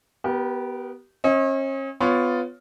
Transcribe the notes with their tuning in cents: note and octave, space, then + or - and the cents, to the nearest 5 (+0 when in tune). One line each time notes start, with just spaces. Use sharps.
B3 +0 G4 -20 A#4 +35
C#4 -40 D#5 +35
B3 +25 F4 +5 C#5 +15